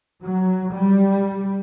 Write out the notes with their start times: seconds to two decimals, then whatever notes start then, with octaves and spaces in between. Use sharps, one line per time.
0.23 F#3
0.73 G3